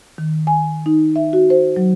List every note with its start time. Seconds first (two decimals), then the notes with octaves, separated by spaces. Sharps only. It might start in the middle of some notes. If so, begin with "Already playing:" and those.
0.18 D#3
0.47 G#5
0.86 D#4
1.16 E5
1.33 F#4
1.50 C5
1.76 F#3